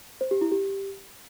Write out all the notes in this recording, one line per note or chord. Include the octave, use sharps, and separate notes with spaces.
C5
G4
E4
G4